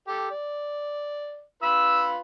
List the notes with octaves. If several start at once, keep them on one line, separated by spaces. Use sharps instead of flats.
G4 A4
D5
F4 B4 B5 E6